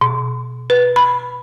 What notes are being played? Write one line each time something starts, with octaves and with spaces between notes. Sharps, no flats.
B2
B4
B5